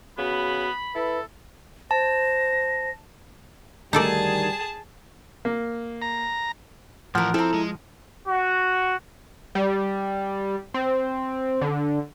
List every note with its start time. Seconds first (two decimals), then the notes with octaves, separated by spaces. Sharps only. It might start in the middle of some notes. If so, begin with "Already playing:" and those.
0.18 C#3 B3 F#4 B5
0.95 E4 A4 B4
1.91 C5 A5 A#6
3.93 D2 D#3 G3 D#4 G#4 A4 D5 A5
5.45 A#3
6.02 A#5
7.15 A2 E3 F3 A#4 F#5
7.34 C4 E4 A4 A#5
7.54 G#3
8.28 F#4
9.55 G3
10.74 C4
11.61 D3